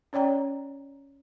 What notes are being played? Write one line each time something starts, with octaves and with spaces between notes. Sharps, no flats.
C#4 C#5 D5 G5 A#5